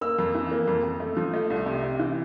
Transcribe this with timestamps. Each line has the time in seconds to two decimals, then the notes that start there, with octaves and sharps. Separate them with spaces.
0.01 A#3 E6
0.19 F2
0.35 E3
0.51 A#3
0.68 F2
0.84 F2
1.00 A3
1.17 F3
1.34 A3
1.50 C2
1.66 C3
1.83 C3
2.00 E3